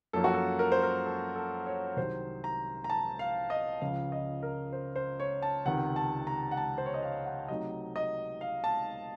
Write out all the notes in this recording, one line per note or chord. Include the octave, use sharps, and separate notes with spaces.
F#2 F3 A#3 C#4 A4
F#4
A4
A#4
C5
A#4
A4
A4
C#5
C2 C3 D#3 F#3 C5
A#5
A#5
A5
F5
D#5
C#2 C#3 F3 F5
D#5
A#4
C5
C5
C#5
A5
C#2 C3 D#3 F#5
A5
A#5
F#5
A5
C5
C#5
D#5
F5
F#5
C3 F#3 A3 D#4 D#5
D#5
F5
A5